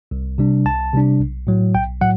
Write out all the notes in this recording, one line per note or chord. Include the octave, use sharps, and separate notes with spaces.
C2
C3 G3 D4
C2 A5
C3 G3 D4
B1
A2 F#3
B1 G5
A2 F#3 F#5